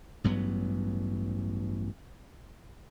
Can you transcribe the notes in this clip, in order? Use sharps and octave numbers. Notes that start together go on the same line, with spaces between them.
A1 G2 F#3 B3